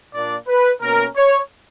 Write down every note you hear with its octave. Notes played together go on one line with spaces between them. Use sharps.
A#2 A#3 D4 D5
B4
B2 A#3 C#4 A#4
C#5